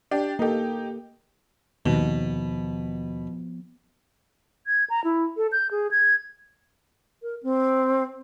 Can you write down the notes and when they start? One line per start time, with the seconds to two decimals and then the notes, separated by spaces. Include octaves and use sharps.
0.11 D4 G4
0.39 A#3 D#4 G4 A4
1.86 D#2 B2 F3 B3 C4
4.67 G#6
4.90 A#5
5.04 E4
5.37 A4
5.52 G6
5.71 G#4
5.91 G#6
7.22 A#4
7.43 C4